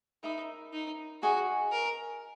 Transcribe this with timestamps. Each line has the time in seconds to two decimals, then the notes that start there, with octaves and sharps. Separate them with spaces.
0.23 D#4 A#4 E5 B5 D#6
0.73 D#4
1.23 F#4 G#4 D#5 G#5 C#6
1.72 A#4